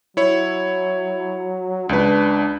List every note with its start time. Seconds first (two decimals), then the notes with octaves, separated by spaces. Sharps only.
0.17 F#3 E4 C#5
1.89 C#2 D4 B4